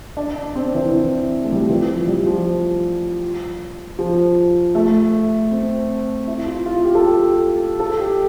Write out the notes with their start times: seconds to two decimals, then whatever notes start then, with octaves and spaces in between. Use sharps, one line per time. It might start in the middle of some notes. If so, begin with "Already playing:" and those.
0.17 D4
0.36 D4
0.55 C4
0.74 E3
0.93 E3
1.44 A3
1.52 G3
1.61 F3
1.69 E3
1.88 F3
2.07 G3
2.26 F3
3.99 F3
4.75 A3
5.51 C4
6.27 E4
6.46 F4
6.66 F4
6.84 G4
6.95 A4
7.05 G4
7.79 A4
7.99 G4